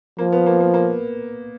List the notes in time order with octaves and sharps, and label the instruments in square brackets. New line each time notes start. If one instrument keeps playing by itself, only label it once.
[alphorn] F3 [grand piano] A#3
[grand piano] B3
A#3
A#3
A#3